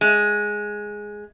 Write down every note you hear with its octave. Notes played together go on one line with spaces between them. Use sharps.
G#3